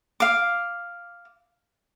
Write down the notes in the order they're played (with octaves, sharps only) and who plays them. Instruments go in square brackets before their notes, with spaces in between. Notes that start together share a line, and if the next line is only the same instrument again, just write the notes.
[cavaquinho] F5 D6